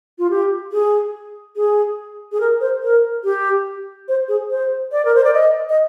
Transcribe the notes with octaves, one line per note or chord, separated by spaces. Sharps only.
F4
G4
G#4
G#4
G#4
A#4
C5
A#4
G4
C5
G#4
C5
D5
A#4
C5
D5
D#5
D#5